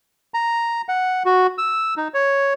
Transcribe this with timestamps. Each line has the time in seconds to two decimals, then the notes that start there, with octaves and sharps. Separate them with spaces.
0.34 A#5
0.89 F#5
1.25 F#4
1.58 E6
1.97 D#4
2.14 C#5